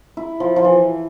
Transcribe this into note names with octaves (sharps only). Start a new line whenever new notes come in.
E4
F3
F3
E3